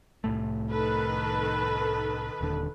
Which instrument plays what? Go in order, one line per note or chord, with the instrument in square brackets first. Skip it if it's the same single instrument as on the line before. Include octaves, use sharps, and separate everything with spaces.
[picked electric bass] C2 A2 A3
[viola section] D#3 A4 B4
[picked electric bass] D#1 D#2 D3